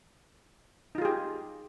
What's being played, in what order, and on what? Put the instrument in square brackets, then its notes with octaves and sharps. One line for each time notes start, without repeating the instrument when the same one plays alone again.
[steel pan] D#4
F4
G#4
G4